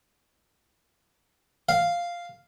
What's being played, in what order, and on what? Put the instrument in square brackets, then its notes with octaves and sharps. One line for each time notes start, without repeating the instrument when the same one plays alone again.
[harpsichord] F5